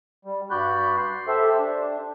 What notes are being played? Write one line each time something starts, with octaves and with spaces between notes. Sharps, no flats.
G3
G2 F#4 D5 B5 F#6 G6
C6
G4 A4 C5 E5
D4